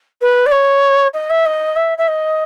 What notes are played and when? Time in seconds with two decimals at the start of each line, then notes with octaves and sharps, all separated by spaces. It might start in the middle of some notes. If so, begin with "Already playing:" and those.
0.21 B4
0.46 D5
0.51 C#5
1.13 D#5
1.30 E5
1.45 D#5
1.76 E5
1.98 E5
2.08 D#5